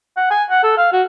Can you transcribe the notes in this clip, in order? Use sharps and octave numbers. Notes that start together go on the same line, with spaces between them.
F#5
G#5
F#5
A4
F5
F#4